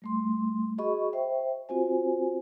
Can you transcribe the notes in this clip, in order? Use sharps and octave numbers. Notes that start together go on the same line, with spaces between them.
G3 A3 C6
F#4 G#4 D#5 B5 C#6
C5 E5 G5
C4 F4 F#4 C5 G#5